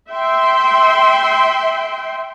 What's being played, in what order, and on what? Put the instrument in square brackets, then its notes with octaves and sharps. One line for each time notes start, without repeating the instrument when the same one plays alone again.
[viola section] E5 G5 C6